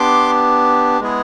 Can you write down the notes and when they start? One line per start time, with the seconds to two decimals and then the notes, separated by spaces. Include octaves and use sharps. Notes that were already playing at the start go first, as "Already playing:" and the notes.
Already playing: B3 D4 G4 C6 D6
1.00 G#3 B3 E4 G#4